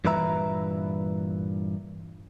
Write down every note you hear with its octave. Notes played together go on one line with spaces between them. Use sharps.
G2 A#2 E3 B4 E5 A#5